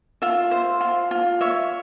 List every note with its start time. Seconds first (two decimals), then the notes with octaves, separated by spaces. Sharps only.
0.22 F4 E5
0.51 C5
0.81 F4
1.11 F4
1.41 C#5 E5